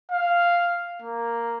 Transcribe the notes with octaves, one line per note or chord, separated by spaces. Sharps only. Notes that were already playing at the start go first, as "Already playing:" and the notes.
F5
A#3